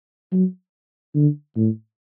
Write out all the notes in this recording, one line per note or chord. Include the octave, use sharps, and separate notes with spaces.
F#3
D3
A2